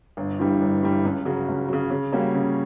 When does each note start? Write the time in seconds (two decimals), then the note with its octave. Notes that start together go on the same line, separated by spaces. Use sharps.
0.17 G1
0.39 G2 E3 G3
0.61 G1
0.83 G2 E3 G3
1.05 C#2
1.26 C#3 F#3
1.48 C#2
1.69 C#3 F#3
1.91 C#3
2.12 G3 A#3 C#4 F#4
2.34 C#3